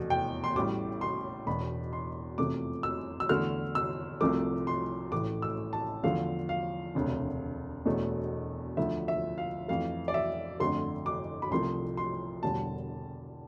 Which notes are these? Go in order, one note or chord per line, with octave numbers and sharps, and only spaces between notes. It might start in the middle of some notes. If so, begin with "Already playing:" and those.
Already playing: F1 E2 B2 A3
G5
C6
A1 A2 G3 D6
C6
E1 E2 B2 B5
C6
F1 E2 C3 F3 A3 D6
E6
E6
E2 D3 A3 F6
E6
C2 C3 F3 A3 D6
C6
A1 A2 E3 A3 D6
E6
A5
E2 D3 F3 A3 F5
F5
E1 D2 C3
E1 E2 B2 A3
D2 D3 F3 E5
E5
F5
F2 E3 A3 F5
D5
E5
G1 F2 D3 A3 C6
D6
B5
C2 C3 F3 A3 C6
C6
E1 E2 D3 G3 A5